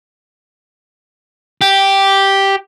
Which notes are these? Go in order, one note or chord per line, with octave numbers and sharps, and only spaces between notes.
G4